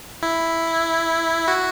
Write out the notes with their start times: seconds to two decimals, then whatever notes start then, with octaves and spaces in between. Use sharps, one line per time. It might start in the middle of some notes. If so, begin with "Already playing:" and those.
0.22 E4
1.48 F#4